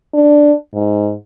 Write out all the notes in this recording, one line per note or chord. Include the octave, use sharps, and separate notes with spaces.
D4
G#2